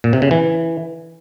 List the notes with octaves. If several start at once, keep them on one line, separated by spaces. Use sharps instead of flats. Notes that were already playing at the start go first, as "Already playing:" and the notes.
A#2
C3
C#3
E3